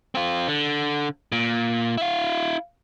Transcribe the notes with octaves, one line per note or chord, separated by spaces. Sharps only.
C4 F4
D3
A#2
E4 F5